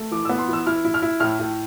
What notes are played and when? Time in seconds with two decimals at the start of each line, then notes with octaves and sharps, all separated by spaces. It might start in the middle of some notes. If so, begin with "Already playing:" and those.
Already playing: A3
0.11 E3 D6
0.25 B3 E6
0.38 C6
0.49 E3 E6
0.66 E4 F6
0.85 E4
0.94 F6
1.02 E4
1.20 A2 F6
1.39 A2